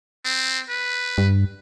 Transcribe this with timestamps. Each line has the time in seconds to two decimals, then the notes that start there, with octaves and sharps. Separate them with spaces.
0.25 C4
0.69 B4
1.18 G2